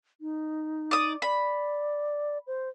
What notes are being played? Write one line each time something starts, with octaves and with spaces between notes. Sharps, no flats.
D#4
D5 D#6
D5 B5
C5